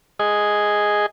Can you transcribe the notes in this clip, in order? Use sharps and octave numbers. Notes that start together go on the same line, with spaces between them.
G#4 D#5